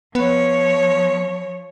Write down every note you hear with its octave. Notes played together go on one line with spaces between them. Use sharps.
F3 B3 C#5